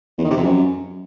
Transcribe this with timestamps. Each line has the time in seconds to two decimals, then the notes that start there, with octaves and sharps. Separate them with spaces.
0.18 E2
0.24 D#3
0.31 C3
0.37 F2
0.43 F#2